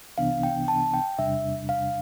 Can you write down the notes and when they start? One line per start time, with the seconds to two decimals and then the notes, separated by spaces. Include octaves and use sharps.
0.18 C2 C3 E3 B3 D4 F5
0.43 G5
0.68 A5
0.94 G5
1.18 E2 C3 G3 D4 E5
1.69 F5